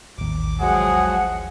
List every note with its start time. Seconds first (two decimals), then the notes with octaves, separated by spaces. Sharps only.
0.18 A1 D#2 D6
0.60 F3 F#3 G#3 G#4 F#5